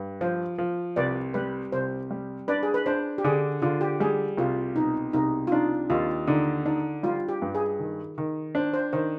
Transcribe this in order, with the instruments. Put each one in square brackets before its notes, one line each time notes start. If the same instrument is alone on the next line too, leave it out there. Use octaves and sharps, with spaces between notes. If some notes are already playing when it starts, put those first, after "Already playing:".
Already playing: [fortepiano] G2
[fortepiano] F3 [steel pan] C5
[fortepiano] F3
[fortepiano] C2 [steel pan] B4 D5
[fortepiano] G3 [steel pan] B4
[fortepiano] C2 [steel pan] C5
[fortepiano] G3
[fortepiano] D4 [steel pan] B4 D5
[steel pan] G#4
B4
[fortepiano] D4 [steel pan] C5
[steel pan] G4
[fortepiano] D3 [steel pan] G#4
[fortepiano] D3 [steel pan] F4
[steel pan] G4
[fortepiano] G3 [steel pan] G#4
[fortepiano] C2 [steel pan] F4
[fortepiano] B2 [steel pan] D#4
[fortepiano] C2 [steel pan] D#4
[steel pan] F4
[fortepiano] D4 [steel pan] D#4
[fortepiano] D#2 [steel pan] F4
[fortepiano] D3 [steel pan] D#4
[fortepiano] D4 [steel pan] D#4
[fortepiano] G3 [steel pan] F4
[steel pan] G4
[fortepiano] G2
[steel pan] G#4
[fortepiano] D#3
D#3
[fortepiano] D4 [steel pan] C5
[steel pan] C5
[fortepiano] D#3 [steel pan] C5